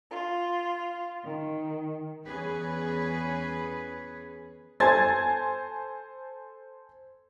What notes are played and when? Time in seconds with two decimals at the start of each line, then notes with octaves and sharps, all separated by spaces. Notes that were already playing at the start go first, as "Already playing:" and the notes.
0.10 F4
1.24 D#3
2.24 E2 C#4 G#4 B4
4.80 A4 C5 G#5 C6 G#6 A6